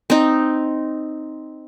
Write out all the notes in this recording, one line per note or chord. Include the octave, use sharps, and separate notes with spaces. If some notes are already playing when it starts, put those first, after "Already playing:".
C4 D#4